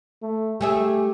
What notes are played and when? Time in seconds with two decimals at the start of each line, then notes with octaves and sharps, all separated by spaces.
0.22 A3
0.61 A3 G4 G#4 E5